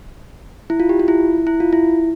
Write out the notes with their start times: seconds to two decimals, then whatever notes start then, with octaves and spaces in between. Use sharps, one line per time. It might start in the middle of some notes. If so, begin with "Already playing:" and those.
0.70 E4
0.80 F4
0.89 G4
0.99 F4
1.08 E4
1.47 E4
1.60 F4
1.73 E4